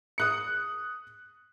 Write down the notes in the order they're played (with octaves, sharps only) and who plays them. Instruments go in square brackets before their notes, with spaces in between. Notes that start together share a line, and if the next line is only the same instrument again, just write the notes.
[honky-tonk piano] D#6 F#6 C#7